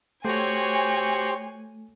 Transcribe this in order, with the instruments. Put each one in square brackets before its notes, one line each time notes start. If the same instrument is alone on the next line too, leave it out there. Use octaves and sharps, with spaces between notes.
[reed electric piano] A3 [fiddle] F#4 C#5 [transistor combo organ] G4 C5 [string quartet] G#5